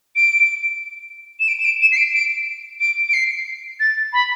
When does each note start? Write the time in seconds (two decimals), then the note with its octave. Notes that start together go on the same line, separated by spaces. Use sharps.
0.16 D7
1.40 E7
1.48 D7
1.60 E7
1.65 D7
1.81 E7
1.92 C7
1.97 D7
2.14 D7
2.80 D7
3.09 D7
3.14 C7
3.80 A6
4.13 B5